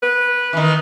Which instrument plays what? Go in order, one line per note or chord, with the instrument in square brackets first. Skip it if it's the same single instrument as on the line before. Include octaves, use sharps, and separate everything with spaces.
[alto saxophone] B4
[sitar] D#3 E3